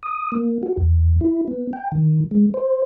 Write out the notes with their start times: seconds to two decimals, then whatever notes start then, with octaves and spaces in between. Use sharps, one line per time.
0.03 D#6
0.32 A#3
0.63 F#4
0.77 E2
1.21 E4
1.48 B3
1.73 G5
1.92 D#3
2.31 G#3
2.54 C5